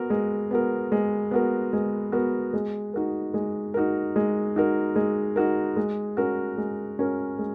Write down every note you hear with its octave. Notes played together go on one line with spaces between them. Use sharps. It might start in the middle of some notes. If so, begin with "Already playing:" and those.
Already playing: B3 F#4 A#4
G#3
B3 F#4 A#4
G#3
B3 F#4 A#4
G#3
B3 F#4 A#4
G#3
D#4 F#4 A#4
G#3
D#4 F#4 A#4
G#3
D#4 F#4 A#4
G#3
D#4 F#4 A#4
G#3
C#4 F#4 A#4
G#3
C#4 F#4 A#4
G#3